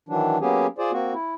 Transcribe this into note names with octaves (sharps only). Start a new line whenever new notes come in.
D#3 E3 F#3 D4
F#3 A#3 B3 C#4 G4 G#4
F4 G#4 C5 D5
A#3 C4 F#4
E4